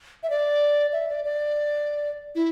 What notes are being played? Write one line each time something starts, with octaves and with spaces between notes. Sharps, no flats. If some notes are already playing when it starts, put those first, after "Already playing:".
E5
D5
E5
D5
D5
E4